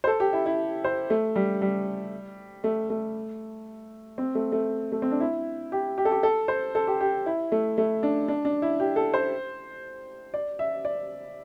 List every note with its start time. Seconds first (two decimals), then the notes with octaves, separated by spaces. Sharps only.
0.04 C5
0.07 A4
0.20 G4
0.33 E4
0.46 E4
0.84 C5
1.10 A3
1.36 G3
1.62 G3
2.64 A3
2.90 A3
4.18 C4
4.35 A3
4.52 A3
4.92 A3
5.02 C4
5.11 D4
5.20 E4
5.72 G4
5.98 G4
6.05 A4
6.12 G4
6.23 A4
6.48 C5
6.75 A4
6.87 G4
7.01 G4
7.26 E4
7.52 A3
7.78 A3
8.03 D4
8.28 D4
8.45 D4
8.62 E4
8.80 G4
8.96 A4
9.14 C5
10.34 D5
10.59 E5
10.85 D5